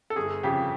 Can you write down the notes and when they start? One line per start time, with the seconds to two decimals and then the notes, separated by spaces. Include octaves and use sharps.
0.10 A4
0.16 G1 G#4
0.43 F2 C#3 G4